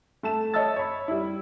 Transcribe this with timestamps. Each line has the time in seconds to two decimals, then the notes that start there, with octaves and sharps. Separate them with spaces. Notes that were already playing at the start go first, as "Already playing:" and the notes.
0.23 A3 A5 E7
0.54 C#5 D#5 E5 A5 E6 A6
0.76 C#5 B5
1.08 G3 E4